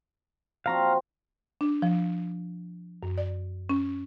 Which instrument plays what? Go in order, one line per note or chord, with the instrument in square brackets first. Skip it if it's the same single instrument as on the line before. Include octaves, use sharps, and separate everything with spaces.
[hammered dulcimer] F3 C4 F#4 [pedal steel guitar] F5 A#5
[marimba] D4
F3
F#2
D5
C#4